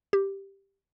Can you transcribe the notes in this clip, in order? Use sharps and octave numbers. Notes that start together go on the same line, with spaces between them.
G4